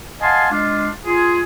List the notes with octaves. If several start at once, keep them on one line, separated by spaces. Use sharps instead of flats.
D#5 F5 F#5 G#5 A5 C6
G#3 D4 F4
F4 G#4